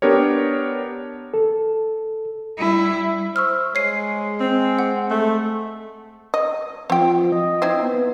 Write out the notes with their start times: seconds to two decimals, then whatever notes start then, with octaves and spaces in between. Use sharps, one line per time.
0.02 B3 D4 G4 A#4 C#5
1.34 A4
2.58 G3 E4
3.36 C5 C#6 E6 F6
3.75 G#3 C#5 C7 D#7
4.40 C4
4.79 F#5
5.10 A3
6.34 D#5
6.90 F3 C4 G5
7.32 D#5
7.62 C4 D#4 E4
7.83 B3